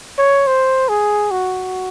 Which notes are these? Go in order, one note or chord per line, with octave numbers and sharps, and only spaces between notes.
C#5
C5
G#4
F#4